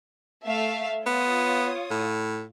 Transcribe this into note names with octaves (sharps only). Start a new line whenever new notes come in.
A3 E5 F5
B3 F4 C#5 D#6
A2